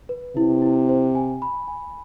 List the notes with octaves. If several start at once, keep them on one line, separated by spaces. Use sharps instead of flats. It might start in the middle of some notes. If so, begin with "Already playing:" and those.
B4
C3 E4
E4
C5
G#5
B5
G#5